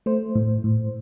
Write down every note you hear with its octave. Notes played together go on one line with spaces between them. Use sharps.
A3 C5
A2
A2